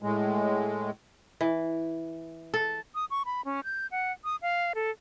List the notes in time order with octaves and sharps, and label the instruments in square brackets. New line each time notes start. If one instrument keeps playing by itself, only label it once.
[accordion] A2 G#3
[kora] E3
A4
[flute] D#6
C#6
B5
C#4
G6
F#5
D#6
F5
A4